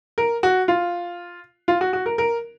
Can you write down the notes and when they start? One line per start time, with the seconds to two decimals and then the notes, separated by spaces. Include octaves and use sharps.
0.18 A#4
0.43 F#4
0.68 F4
1.68 F4
1.81 F#4
1.93 F#4
2.06 A#4
2.18 A#4